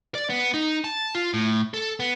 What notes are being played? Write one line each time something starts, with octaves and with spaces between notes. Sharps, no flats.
D5
B3
D#4
A5
F4
A2
A4
B3